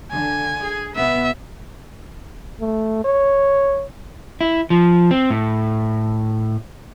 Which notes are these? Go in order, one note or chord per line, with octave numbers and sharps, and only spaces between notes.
D3 G#5
G#4
B2 B3 B4 E5
A3
C#5
E4
F3
C4
A2